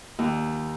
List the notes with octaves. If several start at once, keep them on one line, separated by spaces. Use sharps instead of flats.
D#2